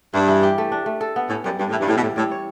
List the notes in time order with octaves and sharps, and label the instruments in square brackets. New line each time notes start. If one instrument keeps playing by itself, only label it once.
[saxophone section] G2 [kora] E4
[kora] E3
G4
A3
D4
A3
A4
B3
[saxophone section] A2 [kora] C#4
[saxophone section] F#2 [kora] G3
[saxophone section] G2 [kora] G3
[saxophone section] A2
[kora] E3
[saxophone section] G2
[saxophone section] A2 [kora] G3
[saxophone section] B2
[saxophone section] A2 [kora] G3
[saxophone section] A2 [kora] G3
[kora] C#5